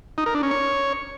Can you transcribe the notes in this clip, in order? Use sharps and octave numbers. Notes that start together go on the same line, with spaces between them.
D#4
A#4
D4
C#4
C#5